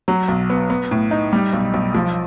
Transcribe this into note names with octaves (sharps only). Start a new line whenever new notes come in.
F#3
B1
B3
B3
A2
D#4
G3
B1
B1
F3